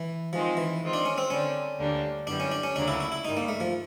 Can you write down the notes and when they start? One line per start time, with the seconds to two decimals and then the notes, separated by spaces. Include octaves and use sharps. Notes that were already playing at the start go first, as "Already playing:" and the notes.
Already playing: E3
0.33 D#3 F3 G#3 C4
0.57 E3
0.81 D#3 G#3 C4 F4
0.93 D4
1.06 C#4
1.18 C4
1.30 D3 G3 C4 C#4
1.78 D2 D3 G3 A#3 D4
2.27 F#2 D3 G3 B3 D4 E4
2.40 C#4
2.52 D4
2.63 C#4
2.76 D2 C#3 F#3 A#3 C#4 D4
2.88 E4
3.00 E4
3.12 E4
3.25 G2 D#3 G3 D#4
3.37 A#3
3.49 A3
3.60 F3